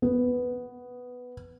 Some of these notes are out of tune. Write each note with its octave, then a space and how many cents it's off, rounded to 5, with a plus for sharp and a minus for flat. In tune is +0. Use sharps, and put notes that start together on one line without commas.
B3 +5